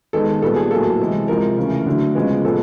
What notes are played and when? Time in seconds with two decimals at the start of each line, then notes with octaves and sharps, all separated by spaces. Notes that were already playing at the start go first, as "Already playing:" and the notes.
0.13 D#3 G#3 B3 A4
0.42 A#2 G3 B3 A4
0.56 G#4
0.71 A2 F#3 A#3 A4
1.00 C3 E3 G#3
1.28 C3 F3 G#3 A#4
1.58 C#3 E3 A3
1.86 D3 F#3 A3
2.15 C#3 F3 G#3 B3
2.44 A#2 F3 G#3 B3 A4